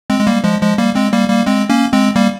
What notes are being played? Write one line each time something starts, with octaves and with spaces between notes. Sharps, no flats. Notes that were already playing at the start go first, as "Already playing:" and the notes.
G#3 C4
G#3
G3 A#3
F3 G#3
F3 G#3
G3 A#3
G#3 C4
G3 A#3
G3 A#3
G#3 C4
A#3 C#4
G#3 C4
G3 A#3